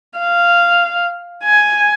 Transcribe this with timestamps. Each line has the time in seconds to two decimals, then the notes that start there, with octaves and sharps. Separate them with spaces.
0.18 F5
1.44 G#5